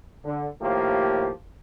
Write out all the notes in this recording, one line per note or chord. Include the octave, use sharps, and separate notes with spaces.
D3
D#2 A2 F3 A#3 G4